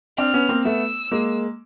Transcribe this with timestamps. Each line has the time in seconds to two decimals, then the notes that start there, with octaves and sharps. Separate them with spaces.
0.18 C4 D4 F6
0.34 B3 C#4
0.49 A#3 C4
0.65 A3 B3 E6
1.12 G#3 A#3